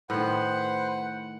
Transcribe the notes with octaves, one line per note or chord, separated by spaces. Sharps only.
A2 D#3 B4 C5 F#5